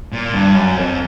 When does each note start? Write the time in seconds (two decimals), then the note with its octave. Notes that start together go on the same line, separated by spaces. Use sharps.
0.12 A#2
0.33 G2
0.55 F#2
0.77 F2